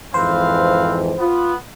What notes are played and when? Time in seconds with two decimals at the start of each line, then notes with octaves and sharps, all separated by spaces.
0.14 F2 G#2 E3 C4 B4 C5 F5
1.18 B3 F4